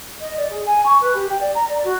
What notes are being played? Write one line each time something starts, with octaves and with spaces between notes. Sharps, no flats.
D#5
D5
G#4
G#5
C#6
B4
G4
G5
D5
A#5
D5
F#4